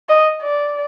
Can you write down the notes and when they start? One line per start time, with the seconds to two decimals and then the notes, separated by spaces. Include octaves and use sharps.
0.09 D#5
0.43 D5